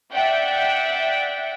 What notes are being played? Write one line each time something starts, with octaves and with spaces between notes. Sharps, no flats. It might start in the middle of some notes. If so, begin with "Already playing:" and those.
D5 E5 F#5 G5